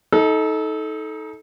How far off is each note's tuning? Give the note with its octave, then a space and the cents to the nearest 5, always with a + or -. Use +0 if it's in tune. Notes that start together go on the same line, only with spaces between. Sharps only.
D#4 +25 A4 -15